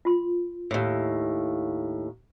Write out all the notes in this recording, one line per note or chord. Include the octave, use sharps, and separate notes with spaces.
F4 C6
D#2 A2